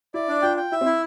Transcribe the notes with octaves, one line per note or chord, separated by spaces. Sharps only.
E4 D5
D4
F4 G5
G5
E4 E5
C4
E4